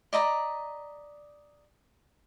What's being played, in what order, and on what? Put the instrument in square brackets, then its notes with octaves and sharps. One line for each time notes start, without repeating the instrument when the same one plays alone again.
[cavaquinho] D5 D#5 A#5 B5